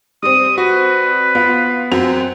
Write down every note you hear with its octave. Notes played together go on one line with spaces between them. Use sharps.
G3 C4 D#6
F#4 B4
B3 F4
F#2 C4 F#4 F7